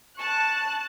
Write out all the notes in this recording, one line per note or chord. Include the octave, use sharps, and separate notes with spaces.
A5 C#6 F#6 E7